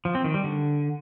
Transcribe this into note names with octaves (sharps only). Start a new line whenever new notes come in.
F3
C4
D#3
G3
D3